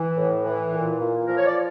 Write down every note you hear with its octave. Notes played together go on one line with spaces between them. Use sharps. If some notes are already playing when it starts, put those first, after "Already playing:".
Already playing: E3
A2
E3
A#2
A#2
F3 A#4
C#5
D5